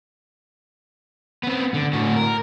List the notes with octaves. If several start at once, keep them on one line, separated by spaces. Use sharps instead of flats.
B3 C4
D3
A2 F#4
A#4